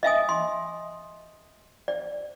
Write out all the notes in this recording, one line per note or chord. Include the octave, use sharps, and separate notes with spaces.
D#5 E5 G#5 D#6
C6
D5